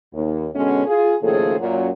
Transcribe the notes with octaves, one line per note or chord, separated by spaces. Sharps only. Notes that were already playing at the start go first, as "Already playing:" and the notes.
D#2
B2 D3 G#3 C#4
F4 G#4
D#2 A2 C#3 F3 G#4 A4
F#2 A#2 F#3